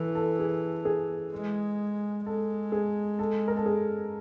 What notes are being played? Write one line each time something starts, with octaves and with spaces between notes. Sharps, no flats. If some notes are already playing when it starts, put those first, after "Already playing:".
Already playing: E3 A4
A4
G#4
G#4
G#3
G#3 A4
G#4
A4
A#4
A4
G#4